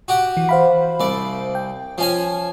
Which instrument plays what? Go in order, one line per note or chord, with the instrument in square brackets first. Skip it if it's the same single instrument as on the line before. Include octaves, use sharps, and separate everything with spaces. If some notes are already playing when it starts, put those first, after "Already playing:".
[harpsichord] F#4 G4 F#5
[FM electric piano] E3
C5 F5 B5
[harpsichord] C2 D5
[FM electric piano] G5
[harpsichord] F3 C#4 G#5